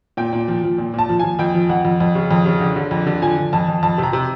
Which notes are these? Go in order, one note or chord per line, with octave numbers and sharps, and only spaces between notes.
A#2 G5
A#2
F3
F3
A#2
A#2 A5
F3
F3 G#5
F2 G5
F3
F2 F#5
F2
F2
C#3
F2
C#3
D3
D3
F2
D3
F3 G#5
F3
F2 A5
F2
F2 A5
C3
A#5
C3